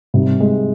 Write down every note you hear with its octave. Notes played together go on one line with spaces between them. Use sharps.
C3 D#3 G3
G#3